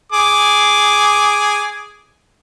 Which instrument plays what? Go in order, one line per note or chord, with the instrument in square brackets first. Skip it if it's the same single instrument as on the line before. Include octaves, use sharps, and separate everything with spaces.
[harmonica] G#4 D6